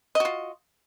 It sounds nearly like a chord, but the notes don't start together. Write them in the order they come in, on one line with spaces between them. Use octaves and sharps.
D#5 F#4 F4